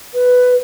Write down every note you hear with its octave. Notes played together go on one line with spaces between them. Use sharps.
B4